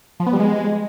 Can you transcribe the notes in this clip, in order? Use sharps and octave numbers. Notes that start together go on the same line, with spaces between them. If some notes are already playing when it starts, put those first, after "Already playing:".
F3
B3
G3
G#3